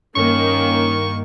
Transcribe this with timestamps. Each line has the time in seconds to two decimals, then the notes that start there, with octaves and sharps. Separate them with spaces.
0.16 G2 D#3 A#3 C#4 C#6